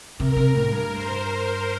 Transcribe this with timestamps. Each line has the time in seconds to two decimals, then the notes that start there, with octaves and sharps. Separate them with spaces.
0.19 C3 A#4
0.36 C3
0.54 A2
0.71 G2
0.90 C5